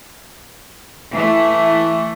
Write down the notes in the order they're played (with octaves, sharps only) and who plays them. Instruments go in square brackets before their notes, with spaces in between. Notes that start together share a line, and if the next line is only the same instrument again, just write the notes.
[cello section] E3 A3